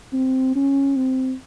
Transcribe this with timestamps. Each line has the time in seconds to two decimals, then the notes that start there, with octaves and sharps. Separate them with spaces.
0.13 C4
0.56 C#4
0.96 C4